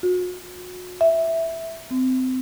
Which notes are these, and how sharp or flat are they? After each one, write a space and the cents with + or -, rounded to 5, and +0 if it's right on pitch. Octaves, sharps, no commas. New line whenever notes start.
F#4 -35
E5 -5
C4 -25